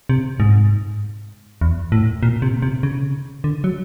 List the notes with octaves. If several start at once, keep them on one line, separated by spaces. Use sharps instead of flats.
C3
G#2
E2
A2
A#2
C3
C3
C#3
D3
F#3